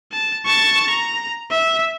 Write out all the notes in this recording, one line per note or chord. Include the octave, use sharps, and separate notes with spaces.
A5
A5 C#6
A#5
E5